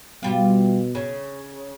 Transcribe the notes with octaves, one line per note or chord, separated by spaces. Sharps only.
B2 G3 F4
C#3